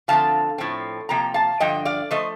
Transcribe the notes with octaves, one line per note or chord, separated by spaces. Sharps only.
D3 F3 C4 F5 A5
A2 F3 C4
C3 F3 A#3 G5 A#5
F5 A5
G2 D3 F3 D#5 G5
D5 F5
F3 A3 C5 D#5